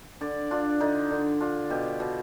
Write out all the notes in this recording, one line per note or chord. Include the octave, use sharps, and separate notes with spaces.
D3 D5
D4 F4
D3 D#4
D3
D4 F4
B2 G4
B2